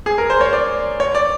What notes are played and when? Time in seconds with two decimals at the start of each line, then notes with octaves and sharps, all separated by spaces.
0.06 G#4
0.18 A#4
0.30 C5
0.41 C#5
0.53 D5
1.00 C#5
1.15 D5